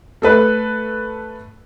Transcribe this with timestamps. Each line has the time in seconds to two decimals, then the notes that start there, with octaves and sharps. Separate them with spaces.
0.22 A3 A4 B4